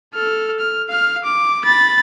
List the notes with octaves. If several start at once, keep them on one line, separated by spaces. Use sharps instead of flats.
A4 F6
F6
F5 F6
D6
B5 A6